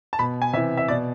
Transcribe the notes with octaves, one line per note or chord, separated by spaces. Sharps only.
A5
B2 B5
G#5
C3 E3 E5
E5
B2 D5